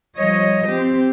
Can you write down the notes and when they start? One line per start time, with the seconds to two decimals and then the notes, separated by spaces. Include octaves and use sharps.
0.17 F3 G3 C#5 D#5
0.68 C4 G4